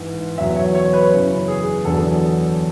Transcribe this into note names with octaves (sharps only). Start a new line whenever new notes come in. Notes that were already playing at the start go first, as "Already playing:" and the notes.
Already playing: G#2 E3
E2 B2 F#3 E5
C#5
C#5
B4
F#2 C#3 E3
G#4
E2 D3 F#3 A4